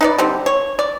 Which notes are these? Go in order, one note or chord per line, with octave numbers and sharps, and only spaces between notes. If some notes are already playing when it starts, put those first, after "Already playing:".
D#4 B4 D5
D3 G3 C4
C#5
D5